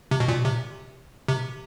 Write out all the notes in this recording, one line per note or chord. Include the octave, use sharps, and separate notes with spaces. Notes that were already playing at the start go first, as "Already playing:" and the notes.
C3
B2
A#2
C3
C3